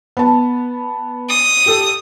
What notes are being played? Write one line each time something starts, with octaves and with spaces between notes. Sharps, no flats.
B3 A5
D#6
G4 A4